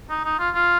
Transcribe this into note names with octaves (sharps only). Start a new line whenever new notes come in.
D#4
D#4
F4
F4